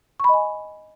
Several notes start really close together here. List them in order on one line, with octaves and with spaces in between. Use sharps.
C#6 B5 D#5 G#5